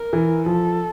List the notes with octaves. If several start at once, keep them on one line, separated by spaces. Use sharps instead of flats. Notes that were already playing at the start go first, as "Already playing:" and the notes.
Already playing: A#4
E3
F3 A4